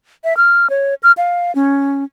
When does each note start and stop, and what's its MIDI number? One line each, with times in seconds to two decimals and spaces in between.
0.24 0.36 76
0.37 0.69 89
0.70 0.94 73
1.03 1.12 89
1.17 1.54 77
1.55 2.04 61